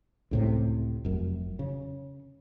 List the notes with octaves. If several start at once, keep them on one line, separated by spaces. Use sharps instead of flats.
C#2 A2 C3
F1 F#2
C#3